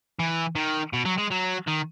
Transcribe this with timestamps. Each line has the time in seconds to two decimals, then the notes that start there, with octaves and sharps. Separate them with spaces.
0.19 E3
0.55 D#3
0.93 B2
1.05 F#3
1.18 G#3
1.31 F#3
1.67 D#3